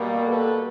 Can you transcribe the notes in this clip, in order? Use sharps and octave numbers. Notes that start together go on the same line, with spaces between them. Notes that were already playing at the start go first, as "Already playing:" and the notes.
Already playing: B2 G3 A#3
A4 B4